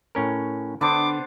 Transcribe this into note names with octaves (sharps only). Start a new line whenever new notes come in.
A2 C#4 A#4
D3 B3 D4 C5 D6